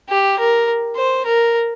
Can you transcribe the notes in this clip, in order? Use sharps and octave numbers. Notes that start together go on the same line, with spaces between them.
G4
A#4
C5
A#4